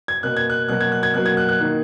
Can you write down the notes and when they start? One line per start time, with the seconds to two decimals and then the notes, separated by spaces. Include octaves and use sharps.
0.08 G#6
0.23 B2 A#3 F#6
0.37 G#6
0.50 F#6
0.69 B2 F#3 A#3 F#6
0.81 G#6
0.92 F#6
1.03 G#6
1.14 B2 F#3 A#3 F#6
1.26 G#6
1.37 F#6
1.49 F#6
1.60 D#3 A#3